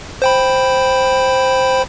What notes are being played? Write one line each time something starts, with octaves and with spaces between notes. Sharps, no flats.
C5 G5 B5